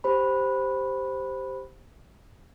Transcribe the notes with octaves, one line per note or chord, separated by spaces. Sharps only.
G4 C5 B5